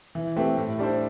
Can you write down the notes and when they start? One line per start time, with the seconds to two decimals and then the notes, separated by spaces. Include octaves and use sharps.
0.15 E3
0.36 A3 C4 G4 B4
0.57 A2
0.79 G3 D4 A4 C5